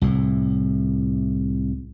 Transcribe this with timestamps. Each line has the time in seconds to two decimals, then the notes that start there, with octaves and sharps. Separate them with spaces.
0.02 C2 A2